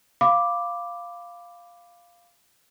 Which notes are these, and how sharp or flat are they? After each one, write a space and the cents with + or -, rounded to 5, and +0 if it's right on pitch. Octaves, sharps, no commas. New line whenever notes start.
F5 +0 B5 +15 D6 +0